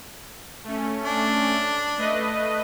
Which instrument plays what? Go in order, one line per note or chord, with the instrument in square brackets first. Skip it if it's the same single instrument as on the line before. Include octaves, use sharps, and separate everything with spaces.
[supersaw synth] A3 C#4
[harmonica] D4
[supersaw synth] A3 B4 D#5